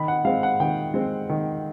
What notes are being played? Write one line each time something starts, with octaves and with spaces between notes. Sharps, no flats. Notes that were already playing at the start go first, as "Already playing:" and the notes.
Already playing: D#3 B5
F#5
G#3 C4 F5
F#5
D#3 G5
G#3 C4
D#3